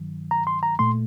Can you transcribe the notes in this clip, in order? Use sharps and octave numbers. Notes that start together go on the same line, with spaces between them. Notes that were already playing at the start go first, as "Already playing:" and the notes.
Already playing: G2 D#3 F#3
A#5
C6
A#5
A#2 A3 C6